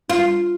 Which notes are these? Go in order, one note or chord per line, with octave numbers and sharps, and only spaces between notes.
F4